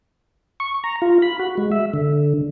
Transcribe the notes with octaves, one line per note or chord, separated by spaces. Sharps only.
C#6
A#5
F4
B5
F#4
G#3
E5
D3